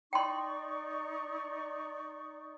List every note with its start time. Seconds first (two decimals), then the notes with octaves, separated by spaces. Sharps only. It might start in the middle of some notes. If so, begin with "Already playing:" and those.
0.13 D#4 D5 G5 C6 C#6